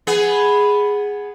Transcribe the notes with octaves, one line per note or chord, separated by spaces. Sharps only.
B3 G#4